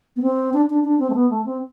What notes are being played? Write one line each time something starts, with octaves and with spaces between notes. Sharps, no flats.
B3
C4
D4
D4
D4
C4
A3
B3
A3
C4